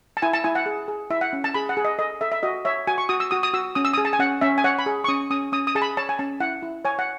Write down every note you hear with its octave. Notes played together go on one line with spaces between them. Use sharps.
A5
E4 G#5
A5
E4 G#5
F#5
G#4
G#4
E4 E5
F#5
C#4
A5
G#4 B5
F#5
G#4
D#5
A4 D#5
A4 E5
E5
F#4 D#5
C#5 E5
F#4 G#5
C#6
F#4 D#6
E6
F#4 D#6
D#6
F#4 E6
C#4 D#6
E6
G#4 D#6
A5
G#5
C#4 F#5
C#4 E5
G#5
C#5 F#5
B5
G#4
C#6
C#4 D#6
C#4 D#6
C#4 D#6
D#6
G#4 A5
B5
C#5 A5
G#5
C#4 A5
E4 F#5
E4
C#5 G#5
F#5